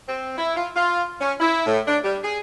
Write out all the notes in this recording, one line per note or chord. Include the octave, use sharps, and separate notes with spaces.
C4
E4
F4
F4
C#4
E4
A2
D4
G3
G#4